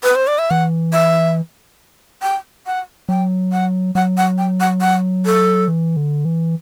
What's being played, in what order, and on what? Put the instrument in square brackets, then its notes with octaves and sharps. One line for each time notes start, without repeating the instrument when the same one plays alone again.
[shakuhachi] B4
C5
D5
E5
[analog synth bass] E3 [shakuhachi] F#5
[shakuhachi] E5
G5
F#5
[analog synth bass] F#3 [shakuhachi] G5
[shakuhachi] F#5
[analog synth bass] F#3 [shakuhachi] F#5
[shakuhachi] F#5
G5
F#5
F#5
A4
[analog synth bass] E3
D3
E3